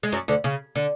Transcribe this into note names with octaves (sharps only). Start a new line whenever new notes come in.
G#3
F#2 F#3
D2 D3
C#3
D3